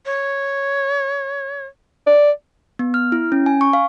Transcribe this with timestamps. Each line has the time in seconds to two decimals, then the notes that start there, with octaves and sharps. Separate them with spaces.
0.06 C#5
2.07 D5
2.79 B3
2.94 F6
3.12 E4
3.32 C#4
3.46 G#5
3.61 C#6
3.73 F5